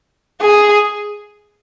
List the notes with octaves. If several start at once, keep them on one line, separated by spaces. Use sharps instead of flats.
G#4